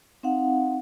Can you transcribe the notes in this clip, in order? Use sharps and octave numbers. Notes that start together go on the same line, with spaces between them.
C4 D#4 F5 F#5